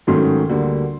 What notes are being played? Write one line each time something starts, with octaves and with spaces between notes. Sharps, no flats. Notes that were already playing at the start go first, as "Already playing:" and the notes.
G#2 D#3 F#3 A3 C#4 C6
D2 D3 G3 A#3